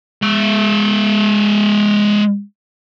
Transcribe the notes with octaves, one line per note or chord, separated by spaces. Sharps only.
G#3 E5